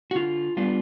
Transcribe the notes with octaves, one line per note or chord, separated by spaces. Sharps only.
F#4
D3 F4
G3 B3 D4 F4